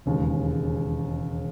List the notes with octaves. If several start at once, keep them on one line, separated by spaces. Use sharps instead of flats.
E1 D#2 C#3 G#3